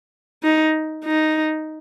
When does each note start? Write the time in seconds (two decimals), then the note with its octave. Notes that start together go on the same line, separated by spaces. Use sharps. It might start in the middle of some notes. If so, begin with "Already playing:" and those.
0.43 D#4
1.05 D#4